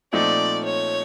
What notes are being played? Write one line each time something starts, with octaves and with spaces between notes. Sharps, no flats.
A#2 F3 A3 C4 D#4 D5
C#5